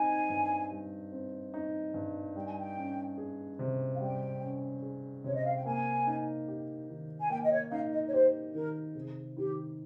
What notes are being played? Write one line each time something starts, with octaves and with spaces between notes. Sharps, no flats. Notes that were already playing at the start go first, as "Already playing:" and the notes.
Already playing: C4 D#4 G#5
G2
G3
C4
D#4
G2
G3 G5
G#5
G5
C#4
G#4
C3
F5
G3 G5
C#4
G#4
C3 C#5
D#5
F5
G5
A#3 G#5
D#4
G4
D#3
G#5
A#3 G5
D#5
C#5
D#4 F5
D#5
C#5
G4 C5
D#3 A#4
C3 G#4
D#3 G4